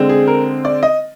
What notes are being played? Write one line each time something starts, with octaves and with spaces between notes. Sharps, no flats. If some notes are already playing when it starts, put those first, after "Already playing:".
Already playing: D3 G#3 C4
G#4
A#4
D5
D#5